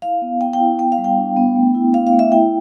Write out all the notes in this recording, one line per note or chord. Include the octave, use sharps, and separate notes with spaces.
E4 F5
B3
B3 G5
G5
E4
B3 G5
F5
G3
G5
D4
B3
A3
E4
E4 F5
F5
A3
E5
E4 G5